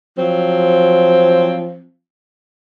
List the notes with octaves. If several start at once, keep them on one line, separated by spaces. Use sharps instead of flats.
F3 F#3 C4